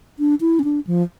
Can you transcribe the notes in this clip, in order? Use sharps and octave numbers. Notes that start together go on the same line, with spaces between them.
D4
E4
C#4
D4
F3